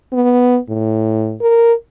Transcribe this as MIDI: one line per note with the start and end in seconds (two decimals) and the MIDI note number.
0.13 0.58 59
0.69 1.36 45
1.41 1.73 70